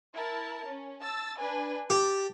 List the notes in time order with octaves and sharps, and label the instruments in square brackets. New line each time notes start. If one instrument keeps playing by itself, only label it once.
[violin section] E4 A#4 A5
C#4
A5 E6 A6
D4 B4 G#5
[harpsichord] G4 [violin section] A5